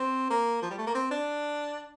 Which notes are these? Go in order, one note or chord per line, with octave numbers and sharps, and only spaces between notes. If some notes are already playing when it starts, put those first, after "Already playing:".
Already playing: C4
A#3
F3
G3
A3
A#3
C4
D4